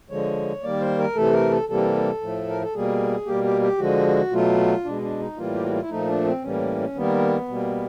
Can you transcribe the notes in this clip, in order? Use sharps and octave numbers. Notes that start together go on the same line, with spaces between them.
D3 F3 G#3 C#5
D#3 G3 A#3 D5
C5
A#4
C3 E3 A3 A4
A#4
A4
C3 E3 G3 A#3 A4
A2 F3 A3
A#4
A4
B2 G3 A#3 G#4
B2 G3 A#3 G4
G4
G4
D3 F3 G#3 F#4
B2 F#3 A3 F4
B2 G#3 D4
D4
D#4
A2 E3 G3 A#3 F4
G4
F#4
F4
E4
A#2 F3 A3 D#4
D4
C4
A2 E3 G3 A#3 C#4
D#3 G3 A#3 B3
B2 G3 A#3